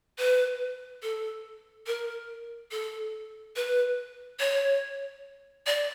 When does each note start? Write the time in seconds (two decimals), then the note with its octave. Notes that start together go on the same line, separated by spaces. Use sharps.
0.18 B4
1.03 A4
1.87 A#4
2.71 A4
3.56 B4
4.40 C#5
5.67 D5